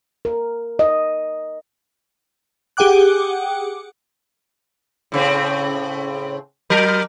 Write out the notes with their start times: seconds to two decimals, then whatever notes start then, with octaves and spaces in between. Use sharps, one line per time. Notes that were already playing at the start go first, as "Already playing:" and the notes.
0.25 A#4
0.79 D#5
2.77 G4 G#4 F#5 G5 D6 F#6
5.12 A2 C#3 C4
6.70 F#3 A#4